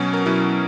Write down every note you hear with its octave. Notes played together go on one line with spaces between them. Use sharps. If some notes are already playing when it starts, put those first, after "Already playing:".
Already playing: B2 F#3 C#4
A#4
B2 F#3 C#4 E4